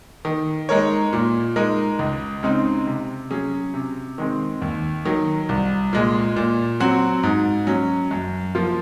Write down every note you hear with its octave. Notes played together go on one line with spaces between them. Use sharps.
D#3
G#3 D#4 A#4 C#5
A#2
G#3 D#4 A#4
C#2
C#3 G#3 C4 D#4
C3
F#3 C#4 G#4
C3
D#3 G#3 C4
D#2
D#3 F#3
C2
A#2 G#3
A#2
F#3 C4 F#4
G#2
F#3 C#4
F#2
F3 A#3 F4